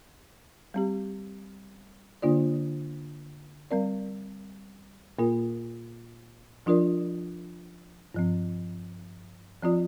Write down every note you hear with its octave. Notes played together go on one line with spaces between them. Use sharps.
G3 C4 G4
D3 A#3 D4 F4 D5
G3 C4 A#4 D5
A#2 A#3 F4 A#4
F3 D4 F4 A#4 D5
G2 F3 C4
F3 C4 F4 D5